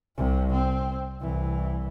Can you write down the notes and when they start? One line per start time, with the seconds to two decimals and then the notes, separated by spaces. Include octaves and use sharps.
0.17 C2 C3
0.53 C4
1.21 C2 E3